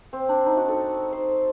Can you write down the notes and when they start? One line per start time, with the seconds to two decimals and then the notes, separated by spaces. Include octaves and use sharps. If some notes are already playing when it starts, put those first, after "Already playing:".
0.13 C4
0.29 D4
0.46 D#4
0.57 F#4
0.68 A4
1.13 C5